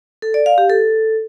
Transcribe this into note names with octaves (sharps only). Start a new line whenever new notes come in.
A4
D5
F5
G4
A4